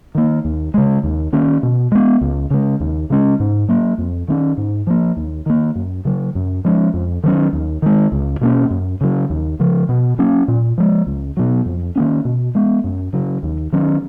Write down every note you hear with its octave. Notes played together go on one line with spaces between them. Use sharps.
D#3 A#3
D#2
C#3 G#3
D#2
D#3 A#3 C#4
B2
G#3 B3
C#2
C#3 G#3
D#2
C#3 G#3 C#4
G#2
F#3 A#3
F2
D#3 A#3 C#4
G#2
F3 A#3
D#2
D#3 A#3
F#2
C#3 F#3
F#2
F3 G#3 C#4
F2
D#3 F#3 C#4
D#2
D#3 G#3
C#2
B2 A#3 C#4
F#2
C#3 F#3
D#2
C#3 F3
B2
F#3 A#3 C#4
A#2
F3 G#3
C#2
B2 F#3
F2
D#3 A#3 C#4
B2
G#3 B3
F#2
C#3 F#3
D#2
D#3 F#3 C#4